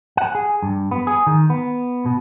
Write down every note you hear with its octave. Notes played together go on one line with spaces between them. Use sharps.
F#5
G#4
G2
B3
G#4
D#3
B3
B2